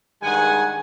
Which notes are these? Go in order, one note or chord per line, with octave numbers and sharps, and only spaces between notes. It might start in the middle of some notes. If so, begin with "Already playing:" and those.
G2 D#3 G#3 F#5 G#5